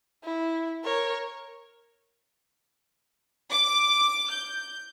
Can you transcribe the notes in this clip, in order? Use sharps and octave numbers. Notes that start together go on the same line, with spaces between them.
E4
A#4 C#5
D6
G6